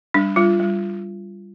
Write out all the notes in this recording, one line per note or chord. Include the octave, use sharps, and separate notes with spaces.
G3 D4
G3 F4
G3